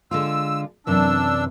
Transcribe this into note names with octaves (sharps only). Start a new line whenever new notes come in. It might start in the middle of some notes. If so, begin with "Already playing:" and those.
D3 G#3 F4 E6
F#2 C3 E3 D4 E6